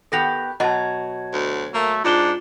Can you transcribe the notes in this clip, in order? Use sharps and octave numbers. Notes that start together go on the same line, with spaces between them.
D#3 B3 G4 A4 A#6 F7
B2 F#3 D#5 A5 A#5
D2
A3 A#3
G#2 D4 F4 E7 G7